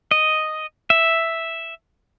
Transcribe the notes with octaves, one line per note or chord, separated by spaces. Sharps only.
D#5
E5